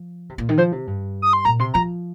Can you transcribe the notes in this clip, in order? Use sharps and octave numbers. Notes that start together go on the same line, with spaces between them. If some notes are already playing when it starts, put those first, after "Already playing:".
Already playing: F3
C3
A#2
D#3
F3 C5
C3
G2
D#6
C6
A#2 A#5
C3 C6
F3 A#5